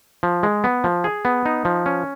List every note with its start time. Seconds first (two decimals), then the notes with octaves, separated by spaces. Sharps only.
0.23 F3
0.43 G#3
0.64 B3
0.84 F3
1.04 G#4
1.25 B3
1.46 D#4
1.65 F3
1.86 C#4